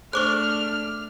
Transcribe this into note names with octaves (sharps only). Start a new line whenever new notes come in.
A3 D4 G#4 C5 C#6 D6 F6 F#6